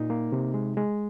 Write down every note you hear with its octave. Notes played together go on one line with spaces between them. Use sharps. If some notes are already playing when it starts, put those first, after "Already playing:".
Already playing: A#2 D#4
A#3
C3
G#3
G#3